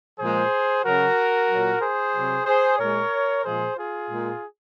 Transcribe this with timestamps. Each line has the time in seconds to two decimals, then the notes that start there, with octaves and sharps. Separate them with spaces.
0.19 A#2 F3 G#3 G#4 C5
0.84 C#3 F#3 F#4 A#4
1.49 A#2 F#3
1.81 G#4 C5
2.14 C3 F#3
2.46 G#4 C5
2.78 A#2 G#3 A#4 C#5
3.43 A#2 F3 G#3 G#4 C5
3.76 F4 G#4
4.08 A#2 G#3